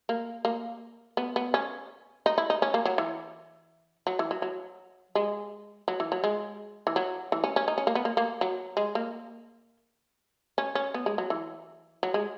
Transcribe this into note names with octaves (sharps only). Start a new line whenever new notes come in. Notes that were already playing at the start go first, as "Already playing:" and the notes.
A#3
A#3
B3
B3
C#4
D#4
E4
D#4
C#4
A#3
F#3
E3
F#3
E3
F#3
F#3
G#3
F#3
E3
F#3
G#3
E3
F#3
E3
C#4
C#4
D#4
C#4
A#3
B3
A#3
A#3
F#3
G#3
A#3
C#4
C#4
B3
G#3
F#3
E3
F#3
G#3